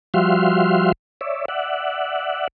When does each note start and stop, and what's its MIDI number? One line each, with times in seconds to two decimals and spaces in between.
0.14 0.92 53
0.14 0.92 55
0.14 0.92 66
0.14 0.92 76
0.14 0.92 77
0.14 0.92 84
1.21 1.45 73
1.21 1.45 74
1.21 1.45 76
1.48 2.48 74
1.48 2.48 76
1.48 2.48 78